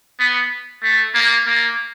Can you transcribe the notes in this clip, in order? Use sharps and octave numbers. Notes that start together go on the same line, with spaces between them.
B3
A3
A#3
A#3